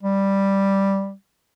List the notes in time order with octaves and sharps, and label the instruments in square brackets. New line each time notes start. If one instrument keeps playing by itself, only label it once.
[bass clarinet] G3